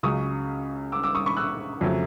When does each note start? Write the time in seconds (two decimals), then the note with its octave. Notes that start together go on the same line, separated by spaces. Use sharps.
0.03 C#2 C#3 F#3 C#6 D#6
0.92 D6 E6
1.03 D6 E6
1.15 C#6 D#6
1.26 B5 C#6
1.37 E6 F#6
1.81 F2 C#3 F#3 A3